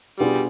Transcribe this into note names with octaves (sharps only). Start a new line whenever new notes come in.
B2 G3 B3 D4 F4 G#4